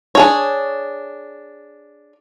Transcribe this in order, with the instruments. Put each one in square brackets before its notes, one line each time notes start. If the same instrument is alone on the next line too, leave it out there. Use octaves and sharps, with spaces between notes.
[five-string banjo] D4 G#4 C#5